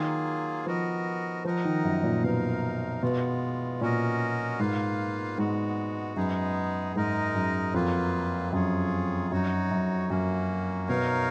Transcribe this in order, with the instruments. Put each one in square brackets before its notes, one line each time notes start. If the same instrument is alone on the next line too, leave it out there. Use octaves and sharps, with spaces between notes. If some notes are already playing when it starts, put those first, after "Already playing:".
Already playing: [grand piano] D#3 [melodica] F#3 A#3 F4 G#4
[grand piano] F3 [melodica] B3 F#4 A#4 D#5
[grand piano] F3 [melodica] D#4 A#4 D#5 F#5
[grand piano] D#3
F#2
A#2
[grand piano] B2 [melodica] D#4 A#4 F5
[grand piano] B2 [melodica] G#3 B3 F4
[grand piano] A#2 [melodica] C#4 F#4 A#4 D#5
[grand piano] G#2 [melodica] A#3 F4 B4 F5
[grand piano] G#2 [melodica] G#3 B3 F#4
[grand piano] F#2 [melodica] G#3 B3 D#4 G#4
[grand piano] G#2 [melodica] G#3 D#4 A#4 D#5
[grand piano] F#2
[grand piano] F2 [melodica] F#3 A#3 F4 B4
[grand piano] F#2 [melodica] F4 G#4 C#5
[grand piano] F#2 [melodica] D#4 F#4 C#5
[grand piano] F#2
[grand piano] F#2 [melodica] A#3 C#4 F#4
[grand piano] B2 [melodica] D#4 A#4 C#5 F5